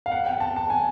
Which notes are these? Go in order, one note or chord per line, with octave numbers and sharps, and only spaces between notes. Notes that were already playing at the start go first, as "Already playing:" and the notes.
F5
F#5
G5
A5
A5
G#5